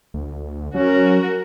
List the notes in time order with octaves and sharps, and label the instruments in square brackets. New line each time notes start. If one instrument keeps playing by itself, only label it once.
[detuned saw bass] D2
[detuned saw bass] F#3 [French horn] C#4 [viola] F#4 A#4